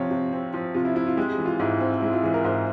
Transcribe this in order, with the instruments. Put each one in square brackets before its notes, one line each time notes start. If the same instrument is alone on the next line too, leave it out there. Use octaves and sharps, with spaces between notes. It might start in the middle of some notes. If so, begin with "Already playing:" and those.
Already playing: [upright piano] C3 F3 C4 C#5 F5
C3
C4
F3
C3 F4
E4
C3 E4
F4
G#3 G4
G#4
E3
F4
G#2 E4
C4
G#3 E4
F4
E3 G#4
A#4
G#2 C5